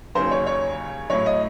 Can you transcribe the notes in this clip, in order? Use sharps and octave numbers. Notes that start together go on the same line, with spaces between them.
D#2 C#3 F#3 C5
C#5
C#5
A2 F#3 C#5
D#5